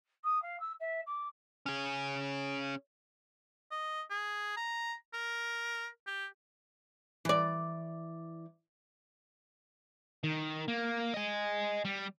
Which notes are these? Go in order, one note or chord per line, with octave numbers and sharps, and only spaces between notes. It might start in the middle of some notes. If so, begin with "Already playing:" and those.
D#6
F5
E6
E5
D6
C#4 G#4
D#5
G#4
A#5
A#4
G4
E3 D5
D#3
A#3
D#5 G#5
G3